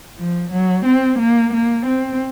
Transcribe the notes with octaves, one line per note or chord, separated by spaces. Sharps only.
F3
F#3
C4
A#3
A#3
C4